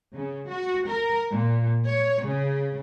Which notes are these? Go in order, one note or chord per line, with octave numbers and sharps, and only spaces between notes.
C#3
F#4
A#4
A#2
C#5
C#3